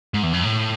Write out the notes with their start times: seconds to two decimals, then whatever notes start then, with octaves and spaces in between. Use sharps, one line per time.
0.14 G#2
0.23 E2
0.33 F2
0.43 A2